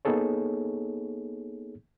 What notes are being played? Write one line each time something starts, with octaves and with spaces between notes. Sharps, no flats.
A#3 B3 D#4 G#4 A4 C#5